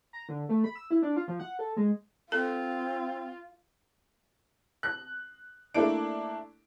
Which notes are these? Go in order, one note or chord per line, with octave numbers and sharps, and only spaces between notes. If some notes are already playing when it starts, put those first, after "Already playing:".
A#5
D3
A3
B5
E6
E4
D4
F4
F3
F#5
A4
G#3
C4 F4 A4
F#6
A3 A#3 D4 E4 D7